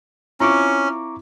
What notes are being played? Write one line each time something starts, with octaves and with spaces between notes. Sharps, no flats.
C4 C#4 E4 F4 A#5 C#6 D6